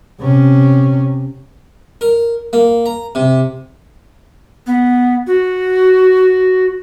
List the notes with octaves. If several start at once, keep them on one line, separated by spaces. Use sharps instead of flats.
C3 C#4
A#4
A#3
A#5
C3
B3
F#4